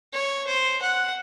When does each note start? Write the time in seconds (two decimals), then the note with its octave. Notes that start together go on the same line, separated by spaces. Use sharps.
0.13 C#5
0.47 C5
0.82 F#5